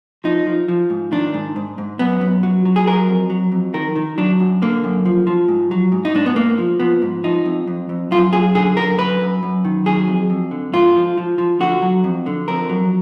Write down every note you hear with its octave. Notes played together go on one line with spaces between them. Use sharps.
F3 D#4
F3
F3
G#2
D#3 D4
G#2
G#2
G#2
F#2 B3
F#2
F#3
F#3
G#4
F#3 A#4
F2
F#3
F2
D#3 A#4
D#3
F#3 D4
F#2
D3 A#3
F#2
F3
F3
G#2
F#3
G#2
D#4
G#2 D4
B3
G#2 A#3
F3
F3 B3
G#2
F3 D#4
F2
F2
F2
F#2 F4
F#2 G#4
D3 G#4
F#2 A#4
F#2 B4
F#2
F#2
D#3
F#3 G#4
F2
F2
D3
G#2 F4
F3
F3
F3
D3 F#4
F#3
F2
D3
F2 A#4
F#3